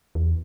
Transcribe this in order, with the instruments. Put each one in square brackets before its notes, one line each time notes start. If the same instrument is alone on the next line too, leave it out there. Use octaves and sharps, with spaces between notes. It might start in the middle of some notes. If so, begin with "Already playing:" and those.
[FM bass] E2